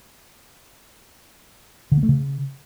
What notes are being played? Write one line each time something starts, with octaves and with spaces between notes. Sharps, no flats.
D3
A#3
A3
C#3